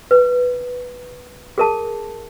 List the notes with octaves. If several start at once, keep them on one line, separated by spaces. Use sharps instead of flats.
B4
G#4 A#4 A5